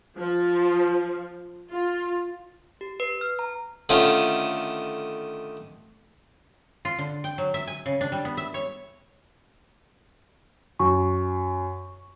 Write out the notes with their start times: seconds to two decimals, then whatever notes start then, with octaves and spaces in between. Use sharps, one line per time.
0.19 F3
1.70 F4
2.81 G4
3.00 B4
3.21 F6
3.39 A#5
3.89 D3 D#3 A3 C#4 F4
6.85 F4
6.99 D3
7.24 G5
7.38 F#3
7.54 E5
7.67 G#5
7.86 C#3
8.01 D4
8.12 G3
8.25 B3
8.37 E5
8.54 C#5
10.80 F#2 C#6